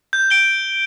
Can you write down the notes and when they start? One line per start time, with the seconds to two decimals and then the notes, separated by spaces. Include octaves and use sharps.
0.13 G6
0.30 D7 G7